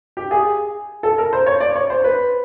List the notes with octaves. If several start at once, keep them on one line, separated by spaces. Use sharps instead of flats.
G4
G#4
A4
A#4
C5
C#5
D5
C#5
C5
B4